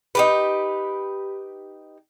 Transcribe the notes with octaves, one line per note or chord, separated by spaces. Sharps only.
D#4 G4 B4